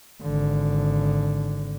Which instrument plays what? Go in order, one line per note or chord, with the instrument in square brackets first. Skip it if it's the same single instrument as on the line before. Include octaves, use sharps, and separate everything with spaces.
[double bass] G#1 D3